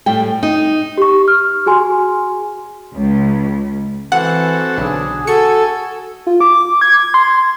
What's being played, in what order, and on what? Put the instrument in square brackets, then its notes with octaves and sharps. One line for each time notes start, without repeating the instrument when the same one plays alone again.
[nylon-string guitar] A2 G3 G5
D#4
[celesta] G4 C#6
F6
F#4 G#4 G#5 C6
[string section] C#2
[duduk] E3 [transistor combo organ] C4 F#4 A4 [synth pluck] F#5
[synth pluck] B1 [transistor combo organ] D3 [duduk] G#4
[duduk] F#4 [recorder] A4 [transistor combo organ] G#5 [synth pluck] C#7
[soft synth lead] F4
D6
G#6
C6